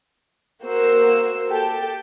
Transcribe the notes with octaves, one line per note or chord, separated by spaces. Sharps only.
A#3 F#4 C5 E6
G4 A4 G5 A5